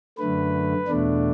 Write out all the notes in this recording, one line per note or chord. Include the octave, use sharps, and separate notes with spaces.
F#2 D3 A3 B4
E2 B2 A3 D4